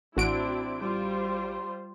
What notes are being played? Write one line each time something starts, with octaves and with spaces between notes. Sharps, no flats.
A1 C4 D4 E4 F#4 D7
G3 F4 C5